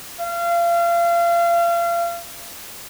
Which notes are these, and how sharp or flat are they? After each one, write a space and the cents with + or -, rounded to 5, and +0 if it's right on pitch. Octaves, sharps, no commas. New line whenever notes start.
F5 -35